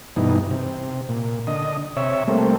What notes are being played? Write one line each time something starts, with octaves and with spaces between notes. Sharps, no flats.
G2 B2 E3 D#4
C3
A#2
D3 D#5
C3 C#5 E5
G3 A3 A#3 C4